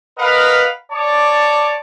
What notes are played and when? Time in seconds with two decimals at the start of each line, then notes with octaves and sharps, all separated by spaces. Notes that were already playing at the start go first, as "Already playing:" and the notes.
0.19 A#4 B4 D#5 F5 F#5 B5
0.92 C#5 D5 A5 D6